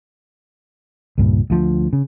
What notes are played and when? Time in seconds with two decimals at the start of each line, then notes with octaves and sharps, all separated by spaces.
1.18 C#2 G2 A#2
1.50 D2 F3
1.93 C#3